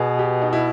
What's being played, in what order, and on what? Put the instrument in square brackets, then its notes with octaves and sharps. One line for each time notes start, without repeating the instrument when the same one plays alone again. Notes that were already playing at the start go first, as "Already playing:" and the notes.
Already playing: [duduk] B2 [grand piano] G#4 B4
[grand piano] G4
D#4
E4